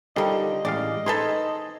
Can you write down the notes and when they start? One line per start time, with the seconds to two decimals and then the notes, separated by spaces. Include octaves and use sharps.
0.16 D3 D#3 F3 G3 D#5
0.65 A1 G#3 D5 F5
1.06 D#4 G#4 A4 B4 C5 C6